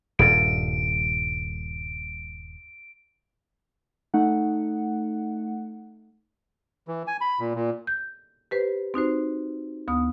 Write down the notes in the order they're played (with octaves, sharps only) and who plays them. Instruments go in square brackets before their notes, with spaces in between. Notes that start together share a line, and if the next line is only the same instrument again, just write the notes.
[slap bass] D#1 G2 [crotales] D7
[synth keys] A3 D#4 F#5
[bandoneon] E3
G#5
B5
A#2
A#2
[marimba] G6
G4 B4 C5
C4 D#4 F#4 C5
D2 B3 D#6